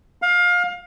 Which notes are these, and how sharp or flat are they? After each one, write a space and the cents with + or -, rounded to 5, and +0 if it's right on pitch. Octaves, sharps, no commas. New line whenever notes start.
F5 +25